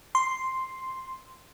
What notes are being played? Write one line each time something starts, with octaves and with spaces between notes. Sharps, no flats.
C6